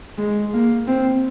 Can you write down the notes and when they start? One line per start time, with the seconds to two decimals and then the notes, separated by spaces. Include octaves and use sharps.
0.18 G#3
0.53 A#3
0.88 C4